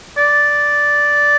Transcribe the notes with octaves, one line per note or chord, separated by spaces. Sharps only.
D5